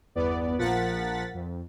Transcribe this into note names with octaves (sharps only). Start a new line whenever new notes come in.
G1 E2 B3 D5
A#1 F3 A#4 F#5 A6 B6
F2